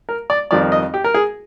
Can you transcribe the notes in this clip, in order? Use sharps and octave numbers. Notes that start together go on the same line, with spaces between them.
A#4
D5
F2 D#3 G3 C4 D5
D#5
G4
A#4
G#4